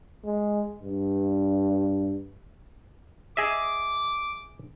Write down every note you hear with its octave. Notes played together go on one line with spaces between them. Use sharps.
G#3
G2
G#4 D#5 E5 D6